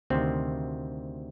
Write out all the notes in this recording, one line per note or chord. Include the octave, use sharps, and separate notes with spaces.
D2 C3 D#3 C4